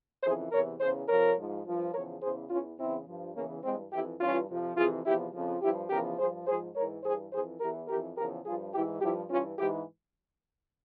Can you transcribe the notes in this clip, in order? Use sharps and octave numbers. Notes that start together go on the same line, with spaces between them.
F2 C#3 E3 G#4 C5
E2 C3 E3 A#4 C#5
E2 C#3 E3 G#4 C5
F2 C3 F3 A#4 C#5
G#2 F3
G2 F3
E2 C#3 F3 A#4 C#5
E2 C#3 E3 G#4 C5
E2 E3 C#4 F4
E2 C#3 E3 C4 E4
G2 F3
E2 C#3 E3 A#3 C#4
G2 E3 G#3 C4
F2 E3 E4 G4
G2 E3 C#4 F4
F2 C3 F3
F2 C3 E3 F4 G#4
E2 C3 F3 E4 G4
F2 C#3 F3
G2 F3 E4 G4
E2 C#3 F3 G4 A#4
G2 F3 G#4 C5
G#2 F3 G#4 C5
G#2 E3 A#4 C#5
G2 E3 G#4 C5
F2 E3 G#4 C5
E2 E3 G4 A#4
F2 E3 G4 A#4
E2 C#3 F3 G4 A#4
G2 F3 F4 G#4
G#2 E3 E4 G4
G2 F3 E4 G4
G2 E3 C#4 F4
G#2 E3 E4 G4